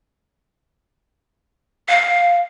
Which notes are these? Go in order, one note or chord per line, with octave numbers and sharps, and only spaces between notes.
F5